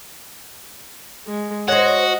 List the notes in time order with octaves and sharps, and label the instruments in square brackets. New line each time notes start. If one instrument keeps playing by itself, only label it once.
[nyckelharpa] G#3
[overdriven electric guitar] F#4 [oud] C5 C#5 [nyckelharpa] D#5